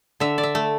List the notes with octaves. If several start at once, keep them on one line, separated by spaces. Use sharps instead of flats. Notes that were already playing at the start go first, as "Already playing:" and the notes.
D3 E5
D5
E5
A3